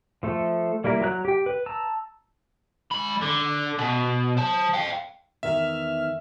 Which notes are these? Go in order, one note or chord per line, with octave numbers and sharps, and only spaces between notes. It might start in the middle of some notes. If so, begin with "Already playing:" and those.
F3 A3 A4
G3 A#3 E4 A#4
F#3 A#5 F#6
G4 G5
B4
A5 A#5 E6
G#3 B5
D3
B2
C5 A5
F5 G5
E2 D#3 A#4 E5 F6